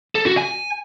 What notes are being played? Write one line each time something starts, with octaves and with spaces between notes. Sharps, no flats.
A4
F#4
G#5